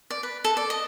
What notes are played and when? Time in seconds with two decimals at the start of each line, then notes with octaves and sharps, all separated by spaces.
0.10 D5
0.23 B4
0.44 A4
0.57 D5
0.70 D#5